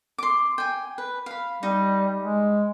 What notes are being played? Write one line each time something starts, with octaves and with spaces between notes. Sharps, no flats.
C6 D6
G5 G#5
B4
F5 B5
G3 D#4
G#3